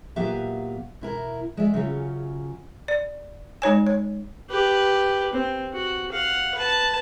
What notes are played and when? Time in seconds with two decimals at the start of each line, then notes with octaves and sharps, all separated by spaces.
0.16 A#2 F#3 B3 G4 E5 F5
1.01 B2 E4 A#4
1.57 G#3 D5 E5
1.74 C#3 F#3 C#4 F4
2.88 D5
3.62 G#3 D#4 C#5 G#5
3.87 C#5
4.49 G4 B4
5.33 C4
5.73 F#4
6.12 F5 F#5
6.55 B4 A5